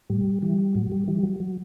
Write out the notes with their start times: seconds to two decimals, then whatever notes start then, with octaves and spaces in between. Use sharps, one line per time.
0.10 A2 G3
0.42 E3 G3
0.75 A2 F#3
0.92 G3
1.08 E3 G3
1.23 F#3
1.40 F#3